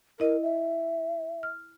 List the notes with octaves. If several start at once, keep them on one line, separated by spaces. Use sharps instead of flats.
E4 A#4 D#5
E5
F6